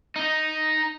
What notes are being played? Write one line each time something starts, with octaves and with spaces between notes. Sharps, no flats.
D#4